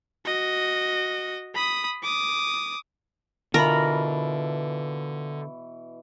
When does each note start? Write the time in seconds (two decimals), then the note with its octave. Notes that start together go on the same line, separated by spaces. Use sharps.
0.25 F#4 D#5
1.55 B5 D#6
2.03 D6 D#6
3.54 B2 D3 E3 F4 A#4 B5